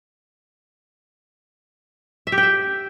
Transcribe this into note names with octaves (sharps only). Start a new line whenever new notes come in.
E5
G4
G5
E5